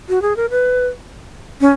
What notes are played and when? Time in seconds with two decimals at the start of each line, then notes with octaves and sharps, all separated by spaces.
0.09 F#4
0.22 G#4
0.36 A#4
0.50 B4
1.61 C#4